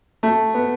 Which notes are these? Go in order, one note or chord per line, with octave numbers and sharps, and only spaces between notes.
A3
B3